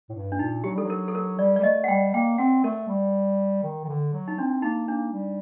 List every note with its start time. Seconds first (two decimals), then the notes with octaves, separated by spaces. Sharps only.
0.10 A2
0.14 G2
0.32 D4
0.39 A#2 D#4
0.64 F#3 G4
0.74 G3 A4
0.83 F#3
0.90 A#4
1.08 A4
1.15 A#4
1.39 G3 D5
1.56 D5
1.60 G3
1.63 A3 D#5
1.84 F#5
1.88 G3 G5
2.14 A#3 G5
2.38 C4 F#5
2.64 A3 A#4
2.88 G3
3.63 D#3
3.84 D#3
3.89 D3
4.13 F#3
4.28 D#4
4.38 C4 D4
4.62 A#3 D#4
4.88 A#3 D4
5.13 G3